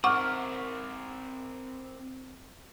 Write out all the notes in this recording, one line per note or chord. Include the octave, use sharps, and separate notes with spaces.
C4 A#4 F#5 C#6 D6 F6